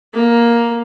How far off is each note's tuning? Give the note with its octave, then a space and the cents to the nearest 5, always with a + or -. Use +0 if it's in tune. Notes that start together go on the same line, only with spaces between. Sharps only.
A#3 +10